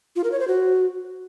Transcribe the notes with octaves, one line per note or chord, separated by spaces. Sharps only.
F4
A#4
C#5
C5
F#4